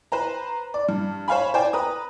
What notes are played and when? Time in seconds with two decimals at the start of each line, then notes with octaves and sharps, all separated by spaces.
0.12 B4 C5 A#5
0.74 D5
0.89 G2
1.28 C5 C#5 F5 G#5 B5
1.54 C5 D5 G5 G#5
1.73 B4 A#5 D#6